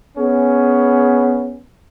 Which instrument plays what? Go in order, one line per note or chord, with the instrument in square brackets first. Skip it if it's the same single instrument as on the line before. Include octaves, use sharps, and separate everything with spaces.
[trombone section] B3 C#4 G#4